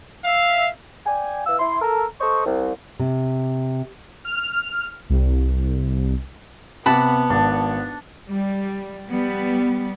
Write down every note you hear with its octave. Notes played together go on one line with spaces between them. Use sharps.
E5 F5
D5 G5 G#5
E3 F5 E6
E4 C6
A4 A#4
A4 C5 D#5 C#6
C2
C3
F6
C2
C3 B3 F#5 A5 B5 D6
G#1 D4
G3
G3 B3